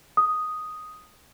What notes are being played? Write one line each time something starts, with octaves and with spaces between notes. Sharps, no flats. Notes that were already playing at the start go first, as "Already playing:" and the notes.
D#6